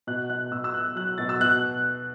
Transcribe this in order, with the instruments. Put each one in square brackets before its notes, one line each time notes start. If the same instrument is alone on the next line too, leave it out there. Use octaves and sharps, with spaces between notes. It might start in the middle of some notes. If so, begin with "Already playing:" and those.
[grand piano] B2 F#6
B2 F#6
B2 E6
E6
B2 F#6
F#3 F#6
B2 A6
E6
B2 F#6